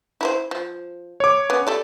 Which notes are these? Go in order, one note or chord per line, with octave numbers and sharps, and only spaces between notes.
E4 A#4 C5
F3
C#5 D6
B3 C#4
G4 A4 D5